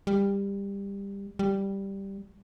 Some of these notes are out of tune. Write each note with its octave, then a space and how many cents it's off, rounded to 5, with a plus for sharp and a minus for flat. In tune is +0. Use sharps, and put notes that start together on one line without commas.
G3 +20
G3 +0